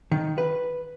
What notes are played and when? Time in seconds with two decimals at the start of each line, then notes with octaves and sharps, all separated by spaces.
0.12 D#3
0.38 B4